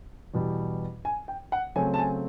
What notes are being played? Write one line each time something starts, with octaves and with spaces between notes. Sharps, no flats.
E2 B2 G3
G#5
G5
F#5
C#3 F#3 A3 C4 G#5
A5
G#5